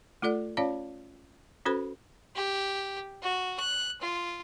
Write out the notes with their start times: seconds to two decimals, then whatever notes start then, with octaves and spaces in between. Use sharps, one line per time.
0.22 A3 F4 A4 D5 F#5
0.57 C#4 F4 C#5 D5 F5 A5
1.65 C#4 F#4 A4 B4 C5 B5
2.35 G4
3.22 F#4
3.59 F#6
4.01 F4